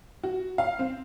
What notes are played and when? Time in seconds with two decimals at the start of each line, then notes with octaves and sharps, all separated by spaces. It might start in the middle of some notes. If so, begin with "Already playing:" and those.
0.23 F#4
0.58 F5
0.79 C4